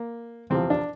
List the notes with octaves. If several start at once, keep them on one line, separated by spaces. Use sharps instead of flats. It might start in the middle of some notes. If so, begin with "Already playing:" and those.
Already playing: A#3
E2 C3 F3 C4
D4